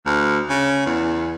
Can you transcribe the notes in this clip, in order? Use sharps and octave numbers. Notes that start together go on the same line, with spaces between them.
D2
C#3
E2